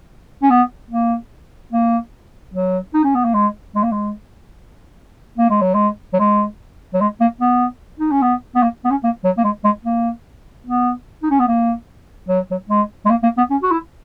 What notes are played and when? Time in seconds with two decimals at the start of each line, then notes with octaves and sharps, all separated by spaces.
0.43 C#4
0.50 B3
0.90 A#3
1.73 A#3
2.54 F#3
2.94 D#4
3.04 C#4
3.15 B3
3.24 A#3
3.34 G#3
3.75 G#3
3.83 A#3
3.92 G#3
5.38 A#3
5.50 G#3
5.61 F#3
5.74 G#3
6.13 F#3
6.20 G#3
6.94 F#3
7.01 G#3
7.21 A#3
7.41 B3
8.00 D#4
8.11 C#4
8.22 B3
8.55 B3
8.62 A#3
8.85 B3
8.91 C#4
9.04 A#3
9.24 F#3
9.38 A#3
9.44 G#3
9.64 G#3
9.85 A#3
10.67 B3
11.23 D#4
11.30 C#4
11.39 B3
11.48 A#3
12.28 F#3
12.51 F#3
12.69 G#3
13.06 G#3
13.10 A#3
13.23 A#3
13.38 B3
13.50 C#4
13.62 F#4
13.71 E4